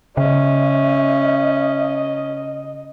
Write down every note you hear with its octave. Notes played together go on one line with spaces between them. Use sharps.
C#3 C#4 D#5 E5